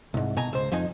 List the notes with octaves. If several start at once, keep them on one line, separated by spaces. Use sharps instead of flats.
C2 G#2
B2 G#5 A#5
C#2 C5
F2 F3 D#4 G#5